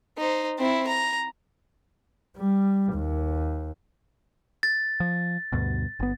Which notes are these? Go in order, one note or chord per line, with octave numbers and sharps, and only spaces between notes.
D#4 C5
C4 E4
A#5
G3
D#2
A6
F3
D2 G2 B2
G1 B3